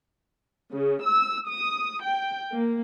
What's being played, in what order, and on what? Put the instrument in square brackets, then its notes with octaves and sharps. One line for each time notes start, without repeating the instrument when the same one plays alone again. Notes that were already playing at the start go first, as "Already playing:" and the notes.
[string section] C#3
E6
D#6
G5
A#3